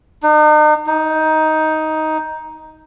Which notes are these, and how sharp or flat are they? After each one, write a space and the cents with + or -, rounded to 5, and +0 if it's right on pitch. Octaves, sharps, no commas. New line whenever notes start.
D#4 -40
D#4 +10